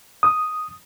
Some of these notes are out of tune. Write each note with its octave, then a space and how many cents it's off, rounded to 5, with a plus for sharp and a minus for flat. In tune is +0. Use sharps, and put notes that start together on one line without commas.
D#6 +0